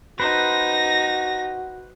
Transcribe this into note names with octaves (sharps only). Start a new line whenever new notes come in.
D#4 F#4 B4 C5 A#6